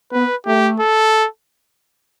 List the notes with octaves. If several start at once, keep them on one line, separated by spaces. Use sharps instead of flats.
B3 B4
A3 G4
A4